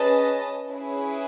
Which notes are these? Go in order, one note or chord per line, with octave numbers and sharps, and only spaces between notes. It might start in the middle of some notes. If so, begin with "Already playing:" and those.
Already playing: C#4 G#4 B4 D#5 A5
C#4 E4 G#4 B4